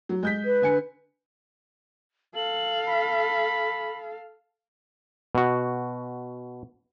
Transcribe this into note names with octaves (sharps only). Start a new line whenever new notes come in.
F#3
G#3 G6 B6
B4
D3 G#5 C#7
A4 F5 F#7
B5
B2 F#4